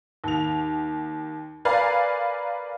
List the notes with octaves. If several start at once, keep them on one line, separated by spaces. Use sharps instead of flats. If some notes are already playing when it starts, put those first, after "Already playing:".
D#2 F7
A#4 B4 D5 F5 G#5 A#5